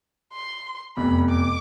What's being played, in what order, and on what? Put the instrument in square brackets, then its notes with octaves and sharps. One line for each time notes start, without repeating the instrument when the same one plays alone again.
[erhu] C6
[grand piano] F1 E2 C3 [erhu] B5
[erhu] D6